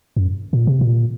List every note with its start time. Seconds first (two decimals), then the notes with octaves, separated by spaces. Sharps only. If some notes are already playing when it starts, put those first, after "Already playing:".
0.16 F#2
0.53 A#2
0.67 C3
0.81 A#2